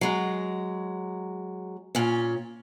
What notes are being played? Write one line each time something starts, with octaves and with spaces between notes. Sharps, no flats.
F#3 G#3
A#2 C#4